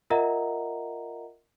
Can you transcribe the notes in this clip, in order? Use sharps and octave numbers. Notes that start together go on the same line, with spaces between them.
F4 A#4 D#5 E5 F#5 A#5